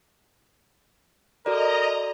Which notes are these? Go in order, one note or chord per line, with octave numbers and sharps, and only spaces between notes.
F#4 A4 A#4 D5 D#5 A#5